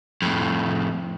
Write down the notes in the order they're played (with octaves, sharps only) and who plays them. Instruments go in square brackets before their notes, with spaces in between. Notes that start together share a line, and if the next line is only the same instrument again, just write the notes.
[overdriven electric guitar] F2 A2